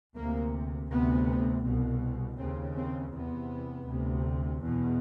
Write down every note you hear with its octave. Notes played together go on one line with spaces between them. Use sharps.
D2 C3 A#3
D2 C3 B3
C2 B2
D#2 C#3 C4
C4
E2 C3 B3
D2 C3
E2 B2